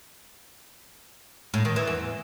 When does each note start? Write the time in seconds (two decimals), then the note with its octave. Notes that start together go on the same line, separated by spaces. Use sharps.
1.54 A2
1.65 D#3
1.76 E3
1.87 E2